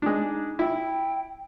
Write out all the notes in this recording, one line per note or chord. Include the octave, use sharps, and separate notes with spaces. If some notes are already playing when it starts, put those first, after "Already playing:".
G#3 D4 D#4
E4 G5